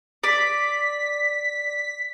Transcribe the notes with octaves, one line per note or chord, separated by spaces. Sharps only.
D5 B6